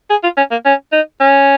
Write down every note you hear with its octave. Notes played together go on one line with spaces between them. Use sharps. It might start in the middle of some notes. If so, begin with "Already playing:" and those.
G#4
F4
C#4
A#3
C#4
D#4
C#4